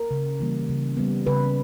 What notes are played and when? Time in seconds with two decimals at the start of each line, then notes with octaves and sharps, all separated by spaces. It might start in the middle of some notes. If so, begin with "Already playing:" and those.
Already playing: A#4
0.11 C#3
0.40 E3 G3 A#3
0.69 C#3
0.97 G3 B3
1.27 C#3 B4